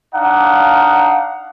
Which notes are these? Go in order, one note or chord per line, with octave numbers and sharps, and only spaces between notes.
D4 D#4 F5 F#5